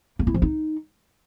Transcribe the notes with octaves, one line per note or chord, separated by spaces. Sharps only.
A#3
E4
F3
D#4